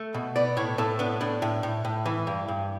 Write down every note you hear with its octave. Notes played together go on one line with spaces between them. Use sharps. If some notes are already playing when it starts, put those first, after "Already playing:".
Already playing: A3
B2
B3 D5
A2 C#5
A2 A4
B3 D4
A2 D4
A2
A2
A2
E3
G2
G2